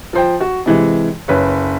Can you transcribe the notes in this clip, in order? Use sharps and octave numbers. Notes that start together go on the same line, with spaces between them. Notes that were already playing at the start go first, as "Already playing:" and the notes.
F3 C5 G5
F#4
C3 E3 G#3
F#1 B4 C#5